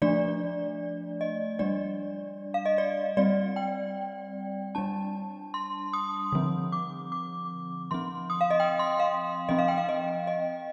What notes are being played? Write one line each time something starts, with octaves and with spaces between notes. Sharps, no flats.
F3 A3 D4 D5
D#5
G3 D4 D5
F5
D#5
D5
G3 C4 D5
G5
G3 D4 A5
C6
D#6
D3 F3 C4
D6
D6
F3 C4 C6
D#6
F5
D#5
G5
C6
F5
F3 C4 D#5
F5
G5
F5
D#5
D#5